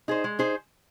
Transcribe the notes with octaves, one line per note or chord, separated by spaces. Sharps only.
D#4 G#4 C5
G#3
D#4 G#4 C5